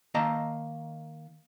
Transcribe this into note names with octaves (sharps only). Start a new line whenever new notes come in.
D#3 A#3 D#5 A5 A#5